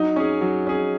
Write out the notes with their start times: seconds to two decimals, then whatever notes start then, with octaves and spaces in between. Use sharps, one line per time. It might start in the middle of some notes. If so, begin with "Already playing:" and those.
Already playing: F#3 D#4
0.16 C#4 G#4
0.41 F#3
0.67 C#4 G#4